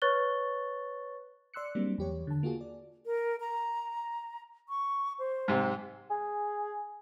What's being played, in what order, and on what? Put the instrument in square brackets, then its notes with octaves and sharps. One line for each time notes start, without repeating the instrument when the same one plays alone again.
[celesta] B4 C#5 C#6 F#6 A6 G7
[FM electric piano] D5 C6 E6 F#6 C#7
F#3 G3 A#3 C4 D4
E2 G4 C#5
D3 A5
A#3 F4 F#4 G#4
D5
[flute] A#4
A#5
C#6
C5
[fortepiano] G#2 C3
[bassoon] G#4